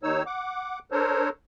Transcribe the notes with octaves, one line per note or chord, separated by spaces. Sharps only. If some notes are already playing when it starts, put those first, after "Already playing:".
D#2 D#3 D#4 C#5 E6
F#5 D6
D4 A4 A#4 C5 C#5